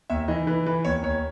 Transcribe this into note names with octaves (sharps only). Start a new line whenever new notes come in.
D#2 E5
E3 D#5
E3 B4
E3 B4
D#2 C#5
D#2 C#5